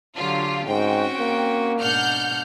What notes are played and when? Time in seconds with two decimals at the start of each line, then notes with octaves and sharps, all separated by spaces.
0.17 D3 F#3 F4 G4
0.69 G#2 C4 C#4 F#4 G5
1.20 A#3
1.80 G#2 B2 D4 F#5 F6 G6